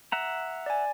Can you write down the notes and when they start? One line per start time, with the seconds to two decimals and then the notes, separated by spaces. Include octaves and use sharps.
0.12 E5 F#5 A#5
0.66 D5 G#5